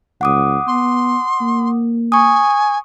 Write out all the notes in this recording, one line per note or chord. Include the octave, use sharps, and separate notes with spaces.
C#2 F#5 D6 D#6
B3 C6
A#3
G#5 C#6 D#6